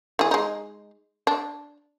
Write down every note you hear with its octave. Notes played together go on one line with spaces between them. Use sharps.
E3 G#4
G#3 D#4
D4